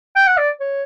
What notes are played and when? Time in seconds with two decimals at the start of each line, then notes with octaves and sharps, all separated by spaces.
0.16 G5
0.27 F#5
0.37 D5
0.60 C#5